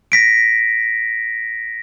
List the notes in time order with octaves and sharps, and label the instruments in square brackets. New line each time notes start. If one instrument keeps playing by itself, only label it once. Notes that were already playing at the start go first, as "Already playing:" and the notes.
[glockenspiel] A#6 B6 D7